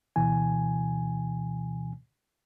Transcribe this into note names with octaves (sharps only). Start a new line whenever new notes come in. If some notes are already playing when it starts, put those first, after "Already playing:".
D2 B2 E3 G#5